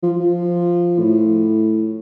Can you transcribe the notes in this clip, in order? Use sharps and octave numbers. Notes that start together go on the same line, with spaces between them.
F3
F3
A2